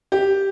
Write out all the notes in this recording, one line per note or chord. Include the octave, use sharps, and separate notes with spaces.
G4